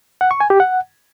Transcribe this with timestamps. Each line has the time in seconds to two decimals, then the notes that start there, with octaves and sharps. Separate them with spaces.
0.21 F#5
0.31 C#6
0.40 G#5
0.50 G4
0.60 F#5